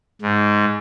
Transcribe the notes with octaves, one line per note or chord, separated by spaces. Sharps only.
G#2